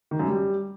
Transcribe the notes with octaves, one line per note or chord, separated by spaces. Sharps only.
D#3
F#2
G3